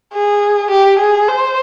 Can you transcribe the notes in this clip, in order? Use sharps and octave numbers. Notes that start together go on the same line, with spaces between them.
G#4
G4
G#4
C5